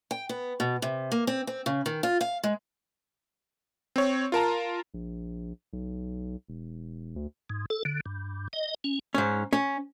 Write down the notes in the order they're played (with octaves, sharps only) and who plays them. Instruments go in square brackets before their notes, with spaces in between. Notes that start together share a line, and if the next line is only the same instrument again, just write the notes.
[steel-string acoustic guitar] G5
B3
B2
C3
A#3
C4
C4
C#3
D#3
F4
F5
G#3
[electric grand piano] C4 C#5
F4 A#4 A5 A#5
[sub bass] A#1
B1
E1
D2
[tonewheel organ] G#2
A4
D3
G2
D#5
C#4
[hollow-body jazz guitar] G#2 C#4
C#4